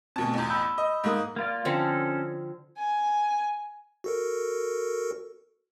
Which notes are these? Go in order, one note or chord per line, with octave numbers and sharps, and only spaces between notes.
D2 B2 C4 A5
A1 E2
B5 E6 G6
D#5
G#2 A#3 D#6
A#3 F4 D5
D3 F3 C4 C#4 A4
G#5
F#4 A4 A#4